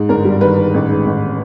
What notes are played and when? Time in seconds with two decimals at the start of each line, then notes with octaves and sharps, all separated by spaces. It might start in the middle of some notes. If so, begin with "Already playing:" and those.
Already playing: G#2
0.09 G1 A#4
0.25 G3
0.41 D#3 B4
0.57 D#3
0.74 A1
0.89 G#2
1.06 A1